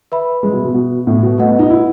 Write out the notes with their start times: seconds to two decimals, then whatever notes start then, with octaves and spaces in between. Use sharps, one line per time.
0.12 B4 E5 B5
0.43 G#3
0.53 B2
0.64 B2
0.74 B2
1.07 A2
1.23 B2
1.38 A3 F#4 B4 D#5 F#5
1.48 B3
1.59 D#4
1.70 E4